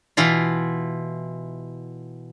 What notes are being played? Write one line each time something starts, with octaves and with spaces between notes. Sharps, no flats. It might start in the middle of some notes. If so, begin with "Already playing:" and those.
B2 E3 E4 F4